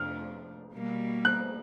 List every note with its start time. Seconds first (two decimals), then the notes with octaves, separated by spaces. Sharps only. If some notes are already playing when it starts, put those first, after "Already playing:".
Already playing: F2 C3 F3 A3 D4 F6
0.73 B2 G3 A#3
1.25 F#6